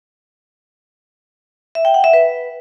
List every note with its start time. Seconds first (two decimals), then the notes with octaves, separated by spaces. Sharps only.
1.75 E5
1.85 G5
1.94 F#5
2.04 E5
2.13 B4